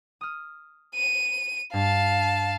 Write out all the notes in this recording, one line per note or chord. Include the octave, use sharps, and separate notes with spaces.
D#6 F6
D#7
G2 F5 A5